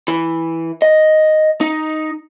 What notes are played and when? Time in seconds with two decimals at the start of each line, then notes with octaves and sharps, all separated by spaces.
0.08 E3
0.82 D#5
1.61 D#4